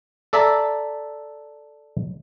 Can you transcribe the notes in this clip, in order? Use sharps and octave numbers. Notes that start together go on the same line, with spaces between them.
A4 D5 E5 A5 A#5